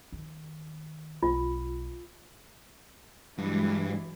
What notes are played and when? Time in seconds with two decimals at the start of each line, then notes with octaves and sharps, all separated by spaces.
0.12 D#3
1.23 B1 F4
3.38 G2 E3 F#3 G#3